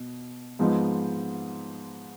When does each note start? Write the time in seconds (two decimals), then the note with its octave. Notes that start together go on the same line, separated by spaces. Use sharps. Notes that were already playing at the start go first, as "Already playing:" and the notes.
Already playing: B2
0.59 G#2 F3 G#3 B3 D#4